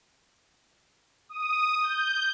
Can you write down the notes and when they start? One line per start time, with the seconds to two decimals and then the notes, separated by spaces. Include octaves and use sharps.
1.29 D#6
1.82 G6